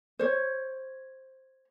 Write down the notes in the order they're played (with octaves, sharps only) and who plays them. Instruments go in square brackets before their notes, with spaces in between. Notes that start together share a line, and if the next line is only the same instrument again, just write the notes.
[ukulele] C5 C#5